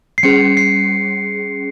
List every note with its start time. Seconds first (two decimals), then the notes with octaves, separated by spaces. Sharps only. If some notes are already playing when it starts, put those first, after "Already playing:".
0.18 C7
0.23 G3 C#4 G#4 C#7
0.57 C7